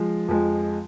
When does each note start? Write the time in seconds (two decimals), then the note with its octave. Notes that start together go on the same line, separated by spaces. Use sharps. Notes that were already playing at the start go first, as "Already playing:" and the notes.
Already playing: F3 G#3
0.28 F2 F3 G#3